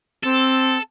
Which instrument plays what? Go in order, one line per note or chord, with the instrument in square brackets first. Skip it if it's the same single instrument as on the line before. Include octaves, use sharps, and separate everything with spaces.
[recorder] C4 [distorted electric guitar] A4